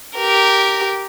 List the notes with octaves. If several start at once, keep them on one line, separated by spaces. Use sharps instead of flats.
G4 A#4